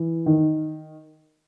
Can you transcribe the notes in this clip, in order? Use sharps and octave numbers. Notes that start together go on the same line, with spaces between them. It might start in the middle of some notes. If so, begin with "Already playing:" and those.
Already playing: E3
D#3